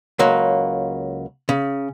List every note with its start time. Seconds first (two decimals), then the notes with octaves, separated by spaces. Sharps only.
0.19 C#2 F#3 A#3
1.49 C#3